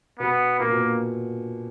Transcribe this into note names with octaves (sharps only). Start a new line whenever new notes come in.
B2 B3
A#2 A#3
B2